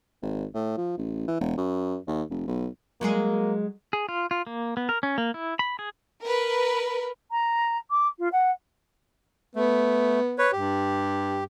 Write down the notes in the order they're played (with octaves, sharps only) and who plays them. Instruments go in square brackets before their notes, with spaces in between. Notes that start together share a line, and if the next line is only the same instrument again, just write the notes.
[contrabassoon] G#1
A2
F3
A1
E3
E1
F#2
D#2
F1
B1
[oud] F#3 G#3 G#4 [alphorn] A#3
[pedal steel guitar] G#4
F4
F4
A#3
B3
A#4
C#4
A#3
E4
B5
G#4
[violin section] A#4 B4
[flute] A#5
D6
F4
F#5
[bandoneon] A3 [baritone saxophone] B3
[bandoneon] B4 C#5
[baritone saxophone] G2 [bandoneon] G4